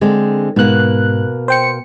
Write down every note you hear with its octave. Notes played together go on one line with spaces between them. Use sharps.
D3 G#3 C4
G#2 B2 A#3 F#6
C5 G5 C#7